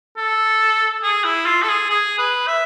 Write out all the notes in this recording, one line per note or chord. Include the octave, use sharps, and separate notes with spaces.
A4
G#4
E4
F4
A4
G#4
G#4
B4
E5